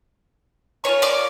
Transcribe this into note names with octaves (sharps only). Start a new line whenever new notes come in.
A#3 C#4 F4 C#5 C#6
D5 D6